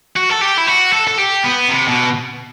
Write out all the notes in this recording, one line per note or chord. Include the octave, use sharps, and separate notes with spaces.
F#4
A4
G4
E4
F#4
A4
A4
G4
B3
C3
B2